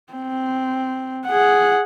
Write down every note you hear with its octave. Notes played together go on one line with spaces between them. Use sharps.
C4
G#4 F#5